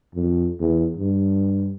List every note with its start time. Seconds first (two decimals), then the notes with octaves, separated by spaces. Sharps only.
0.15 F2
0.60 E2
0.97 G2